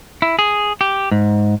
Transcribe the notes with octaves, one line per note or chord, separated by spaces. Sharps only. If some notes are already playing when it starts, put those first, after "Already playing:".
E4
G#4
G4
G#2